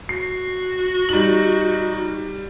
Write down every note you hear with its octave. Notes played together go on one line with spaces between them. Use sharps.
F#4 C7
G3 D#4 F#7